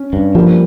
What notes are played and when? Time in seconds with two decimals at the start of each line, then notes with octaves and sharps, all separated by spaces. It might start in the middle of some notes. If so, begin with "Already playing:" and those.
Already playing: C#4
0.13 G2
0.35 F3 G3 A#3